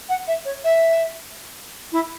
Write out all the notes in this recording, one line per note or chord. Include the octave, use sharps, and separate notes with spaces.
F#5
E5
C#5
E5
E4